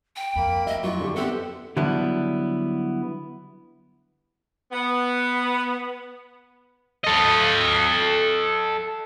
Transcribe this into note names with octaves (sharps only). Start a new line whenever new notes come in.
G5
F2 A#3 B5
D#5 E5
F#3 E4 F4 C#6
D3 G4
B3 C4 G4 A4 E5 F#5
D3 F#3 G3 B3 E4
B3
A4 D#5